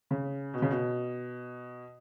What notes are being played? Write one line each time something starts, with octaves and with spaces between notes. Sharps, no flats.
C#3
B2
C#3
B2